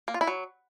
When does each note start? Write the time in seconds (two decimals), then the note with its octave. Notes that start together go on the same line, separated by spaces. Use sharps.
0.08 A#3
0.14 F4
0.21 E4
0.27 F#3